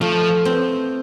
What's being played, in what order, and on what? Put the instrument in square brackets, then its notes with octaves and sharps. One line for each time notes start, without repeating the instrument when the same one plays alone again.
[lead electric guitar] F3 [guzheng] A3
[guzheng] C4